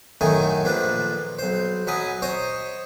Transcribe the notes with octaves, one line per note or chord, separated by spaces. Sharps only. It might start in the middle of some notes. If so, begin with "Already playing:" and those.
F#2 A2 D#3 A3 D#4 G#5
A#1 F3 D4 B4
B1 C5
F#3 B4 D#5 G#5
C5 C#5 D#5